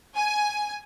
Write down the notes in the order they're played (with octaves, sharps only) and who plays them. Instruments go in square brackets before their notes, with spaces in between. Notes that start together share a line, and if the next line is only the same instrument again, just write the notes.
[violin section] G#5